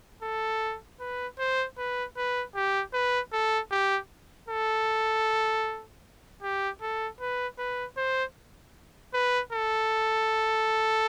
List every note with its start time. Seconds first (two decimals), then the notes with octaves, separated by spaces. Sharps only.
0.23 A4
1.00 B4
1.39 C5
1.78 B4
2.17 B4
2.55 G4
2.93 B4
3.32 A4
3.71 G4
4.48 A4
6.42 G4
6.82 A4
7.20 B4
7.58 B4
7.97 C5
9.14 B4
9.53 A4